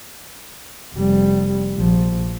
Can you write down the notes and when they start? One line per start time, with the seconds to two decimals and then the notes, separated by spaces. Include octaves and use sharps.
0.96 F1 G3
1.76 A#1 F3